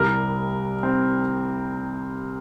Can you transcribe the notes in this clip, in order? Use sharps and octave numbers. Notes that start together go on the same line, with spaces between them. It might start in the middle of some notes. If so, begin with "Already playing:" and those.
Already playing: C2 C3 G3 A#4
C4